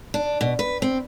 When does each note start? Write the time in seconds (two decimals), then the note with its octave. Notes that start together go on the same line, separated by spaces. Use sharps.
0.14 D4
0.41 B2
0.59 B4
0.82 C4